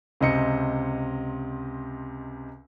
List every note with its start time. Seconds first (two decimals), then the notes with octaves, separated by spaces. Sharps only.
0.21 C#2 C3 D#5 C#7